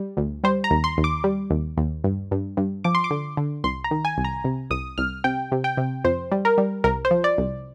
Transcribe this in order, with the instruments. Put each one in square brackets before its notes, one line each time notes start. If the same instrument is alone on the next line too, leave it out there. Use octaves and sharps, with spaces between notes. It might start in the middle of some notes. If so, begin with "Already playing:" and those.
Already playing: [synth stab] G3
D2
G3 C5
A#5
D#2
C6
D#2
D6
G3
D#2
D#2
G2
G2
G2
F3 D6
C6
D6
D3
D3
C2 C6
A#5
D#3
G#5
C2
A#5
C3
C2 D#6
C2 F6
C3 G5
C3
G5
C3
F2 C5
G3
A#4
G3
C2 A#4
C5
F3
D5
C2